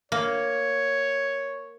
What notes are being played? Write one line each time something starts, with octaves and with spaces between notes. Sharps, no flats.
A#3 C#5